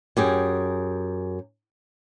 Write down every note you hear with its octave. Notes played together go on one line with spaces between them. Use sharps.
F#2 G4 G#4